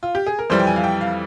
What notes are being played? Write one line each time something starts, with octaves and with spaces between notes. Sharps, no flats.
F4
G4
G#4
A#4
F2 E3 G3 C5
G5
G#5
F5
G5
F5